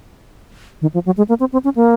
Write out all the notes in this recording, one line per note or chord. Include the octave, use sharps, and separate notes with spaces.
D#3
F3
F#3
G#3
A#3
C4
C4
C#4
A#3